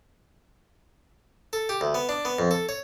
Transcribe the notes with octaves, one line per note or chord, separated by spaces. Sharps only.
A4
G4
D2
B3
D4
B3
F2
A4
C#5